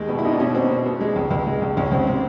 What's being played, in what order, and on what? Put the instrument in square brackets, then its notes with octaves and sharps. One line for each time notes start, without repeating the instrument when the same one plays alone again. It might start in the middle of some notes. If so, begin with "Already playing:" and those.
Already playing: [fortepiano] D#2 G#3
B2 B3
E4
B2 D#4
D4
B2 C#4
B2 C4
B2
B3
G#3
C#2
C#2
G#3
C#2
C#2 C#4
C#2 C4
C3 C4